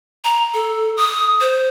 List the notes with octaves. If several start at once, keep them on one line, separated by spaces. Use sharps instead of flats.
A#5
A4
D#6
C5